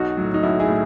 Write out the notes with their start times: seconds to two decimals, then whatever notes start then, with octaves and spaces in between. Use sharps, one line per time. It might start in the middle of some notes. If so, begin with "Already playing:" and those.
Already playing: B1 D#4 F#4
0.17 A2 F#3
0.34 D#4
0.43 B1 E4
0.60 E4 G#4
0.68 A2